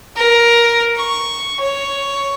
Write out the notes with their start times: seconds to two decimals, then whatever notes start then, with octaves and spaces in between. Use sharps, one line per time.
0.16 A#4
0.96 C#6
1.60 C#5